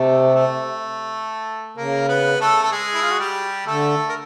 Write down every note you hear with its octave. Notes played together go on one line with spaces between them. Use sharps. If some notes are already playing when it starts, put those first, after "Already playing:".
Already playing: C3 A3 A4
A3 A4
C#3 A#3 A#4
B3 B4
A3 A4
A4
G#3 G#4
E4
F4
F#4
G3 G4
D3 A3 A4
A#4